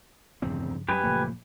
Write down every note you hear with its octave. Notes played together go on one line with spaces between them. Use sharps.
D1 E2 G2 C#3 F3 C4
F#2 G3 G4 B4 G#5 D#6
F#1 A#2 F3 A3 A#3